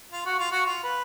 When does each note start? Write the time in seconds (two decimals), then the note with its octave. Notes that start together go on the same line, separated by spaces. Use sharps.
0.11 F4
0.25 F#4
0.38 F4
0.51 F#4
0.65 F4
0.83 B4